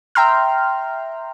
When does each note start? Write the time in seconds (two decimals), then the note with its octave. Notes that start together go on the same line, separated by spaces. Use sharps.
0.15 E5 G5 A#5 C6 F6